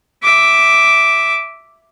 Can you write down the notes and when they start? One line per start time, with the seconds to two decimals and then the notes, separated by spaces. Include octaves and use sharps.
0.23 E5 D6